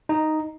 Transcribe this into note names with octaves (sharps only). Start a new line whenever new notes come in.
D#4